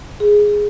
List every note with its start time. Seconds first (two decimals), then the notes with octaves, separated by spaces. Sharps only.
0.20 G#4